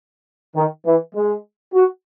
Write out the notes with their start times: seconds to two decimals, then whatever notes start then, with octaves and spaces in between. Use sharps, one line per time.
0.55 D#3
0.86 E3
1.15 G#3
1.74 F#4